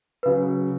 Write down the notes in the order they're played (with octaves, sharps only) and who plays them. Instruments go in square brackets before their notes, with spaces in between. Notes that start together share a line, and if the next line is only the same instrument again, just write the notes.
[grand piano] C#3 F#3 [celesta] B4